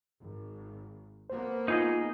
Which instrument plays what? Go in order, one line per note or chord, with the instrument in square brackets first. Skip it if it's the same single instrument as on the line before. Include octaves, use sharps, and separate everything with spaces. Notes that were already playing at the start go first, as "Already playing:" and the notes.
[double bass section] G#1
[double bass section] A#3 B3 [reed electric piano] C5
[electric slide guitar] D#4 G#4 D#5 [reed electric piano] F4